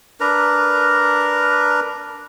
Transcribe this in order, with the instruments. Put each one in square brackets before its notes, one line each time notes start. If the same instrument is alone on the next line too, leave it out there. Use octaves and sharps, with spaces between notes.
[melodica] D4 A#4 B4 A#5